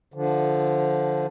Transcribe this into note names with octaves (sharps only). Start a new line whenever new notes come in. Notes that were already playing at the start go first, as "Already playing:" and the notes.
D3 F3